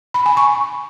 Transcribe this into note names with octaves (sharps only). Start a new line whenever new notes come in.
B5
G#5
C#6